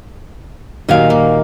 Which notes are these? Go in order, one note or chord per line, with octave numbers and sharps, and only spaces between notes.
A#2 D#3 G3 F#4 F5 G#5
A#3